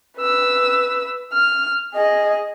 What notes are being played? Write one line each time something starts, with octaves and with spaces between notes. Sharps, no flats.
B4 E6
F6
G#4 D#5